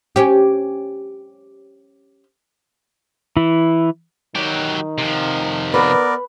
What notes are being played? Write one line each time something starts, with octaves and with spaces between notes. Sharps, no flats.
C#4 G4
E3 E4
D#3 F#3 G4
C3 F3
B3 A#4 B4 D5